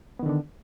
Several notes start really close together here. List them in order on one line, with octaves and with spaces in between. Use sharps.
B3 D#3 D3 D4